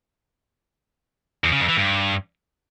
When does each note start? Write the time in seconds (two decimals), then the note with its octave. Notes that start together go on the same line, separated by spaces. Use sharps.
1.44 E2
1.52 C#3
1.60 F2
1.69 E3
1.77 G2